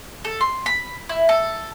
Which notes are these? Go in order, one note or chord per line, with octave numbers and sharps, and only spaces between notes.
A4
C6
B5
E4
A4